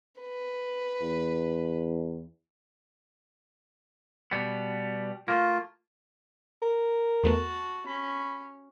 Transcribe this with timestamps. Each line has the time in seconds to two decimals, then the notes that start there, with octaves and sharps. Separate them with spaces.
0.21 B4
1.02 E2
4.31 B2 G3 B3
5.28 A3 A#3 F4
6.62 A#4
7.23 E2 A3 B3 F#4 A5
7.86 C#4 B5